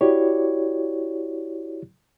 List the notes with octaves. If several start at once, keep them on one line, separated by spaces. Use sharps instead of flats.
E4 F#4 G4 C#5 D5